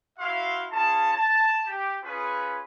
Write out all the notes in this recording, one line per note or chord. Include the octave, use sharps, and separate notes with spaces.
E4 F#4 E5 F5 C6
C#4 F4 G#4 A5
A5
G4
C#4 F4 G#4 B4